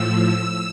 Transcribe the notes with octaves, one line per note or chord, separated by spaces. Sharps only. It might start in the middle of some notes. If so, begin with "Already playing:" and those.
Already playing: A2 F3 E6